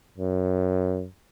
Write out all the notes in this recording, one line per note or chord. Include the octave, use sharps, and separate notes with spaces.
F#2